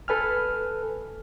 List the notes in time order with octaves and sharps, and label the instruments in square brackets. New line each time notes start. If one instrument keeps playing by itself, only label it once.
[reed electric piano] A4 B4 G#5 F6